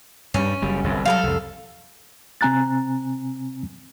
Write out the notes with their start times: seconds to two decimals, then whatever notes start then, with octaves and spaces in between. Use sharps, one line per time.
0.34 G2 G3 C#4
0.62 F#1 G3
0.84 G1 C2 F#2
1.05 F#3 G3 A4 B4 F5
1.23 C2 F2
2.41 C3 C4 G#5 A#5 F#6 A6